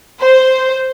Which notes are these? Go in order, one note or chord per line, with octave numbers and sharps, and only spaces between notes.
C5